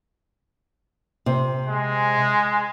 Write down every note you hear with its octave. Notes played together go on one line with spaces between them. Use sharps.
C3
G#3